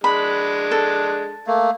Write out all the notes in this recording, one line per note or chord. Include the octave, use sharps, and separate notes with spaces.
G#3 D4 B5
A4
A3 A#3